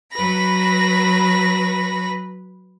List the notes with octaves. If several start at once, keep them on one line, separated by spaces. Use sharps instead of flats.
F#3 B4 B5 A#6